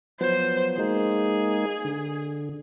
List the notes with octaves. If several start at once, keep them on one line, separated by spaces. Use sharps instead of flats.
F3 F#3 B3 C5
G#3 A#3 D#4 G#4
D3